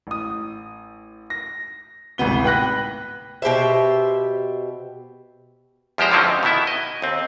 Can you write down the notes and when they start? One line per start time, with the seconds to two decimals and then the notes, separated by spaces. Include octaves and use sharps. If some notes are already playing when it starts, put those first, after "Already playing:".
0.07 A1 D#6
1.30 A#6
2.18 D1 G#1 C3 B3 G7
2.44 B4 G5 B5 F#6 A#6
3.42 B2 G4 C5 E5
5.98 E2 F3 G#3 G4 C5 A#5
6.11 D3 F3 F#3 C4 C#4 D#4
6.24 F2
6.43 B2 D#3 B3 E4 E5
6.67 D#5
7.02 D#2 C4